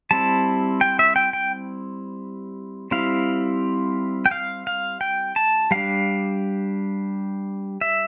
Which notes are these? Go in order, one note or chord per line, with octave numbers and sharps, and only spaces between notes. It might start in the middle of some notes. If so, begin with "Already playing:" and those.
G3 C4 E4 A5
G5
E5
G5
G5
G3 C4 E4 F5
G5
F5
F5
G5
A5
G3 D4 F5
E5